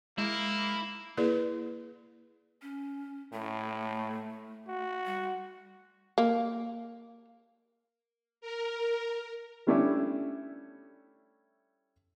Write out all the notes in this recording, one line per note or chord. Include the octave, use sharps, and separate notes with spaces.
G#3 A#3 E4
A#3 E4 G#4 B4 D5
C#4
A2 A3
F#4
G3
A#3
A#4
G3 A3 C#4 D4 E4 E5